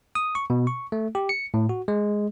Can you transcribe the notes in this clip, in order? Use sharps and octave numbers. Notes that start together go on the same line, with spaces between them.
D#6
C#6
B2
C#6
A3
G4
C#7
A2
F#4
G#3